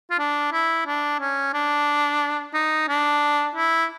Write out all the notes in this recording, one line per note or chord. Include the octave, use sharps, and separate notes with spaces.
F4
D4
E4
D4
C#4
D4
D#4
D4
E4